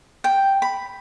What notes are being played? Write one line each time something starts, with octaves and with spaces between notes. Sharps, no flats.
G5
B5